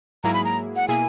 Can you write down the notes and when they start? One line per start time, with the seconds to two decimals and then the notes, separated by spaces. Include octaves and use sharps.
0.24 G#2 F#3 A#3 E4 G#4 A#5
0.34 B5
0.45 A#5
0.76 F#5
0.88 B2 A#3 E4 G#4 G#5